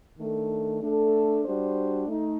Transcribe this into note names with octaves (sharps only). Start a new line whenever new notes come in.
D#3 A3 D4 A4
A3 D4 A4
G3 D4 F#4 C5
A3 D#4